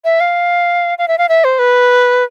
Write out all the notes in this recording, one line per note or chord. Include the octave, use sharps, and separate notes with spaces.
E5
F5
F5
E5
F5
E5
C5
B4